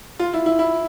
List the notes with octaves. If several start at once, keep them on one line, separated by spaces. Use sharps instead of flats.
F4
E4
E4
E4